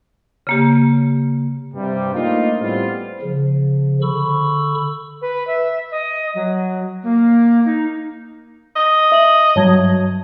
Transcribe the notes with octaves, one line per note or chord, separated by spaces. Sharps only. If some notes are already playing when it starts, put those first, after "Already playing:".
C#3 A#3 G4
G2 C3 G3
A3 A#3 D4 D#4 F4
A2 G3 B3 C4 F4
C#3 F3
D3 B5 C#6 E6
B4
E5
D#5
F#3
A#3
D#4
D#5
E5 F#7
G2 F#3 C#5 A5 G#6